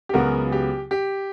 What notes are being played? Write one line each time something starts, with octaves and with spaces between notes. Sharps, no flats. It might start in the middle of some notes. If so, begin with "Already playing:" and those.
G4
C#2 C#3 F#3 B3 F#4 A#4
G4
G4